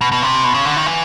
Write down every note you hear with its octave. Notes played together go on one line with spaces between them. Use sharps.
B2
B2
C3
B2
C#3
D3
D#3
E3